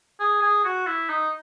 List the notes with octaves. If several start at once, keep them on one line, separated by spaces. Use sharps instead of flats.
G#4
G#4
F#4
E4
D#4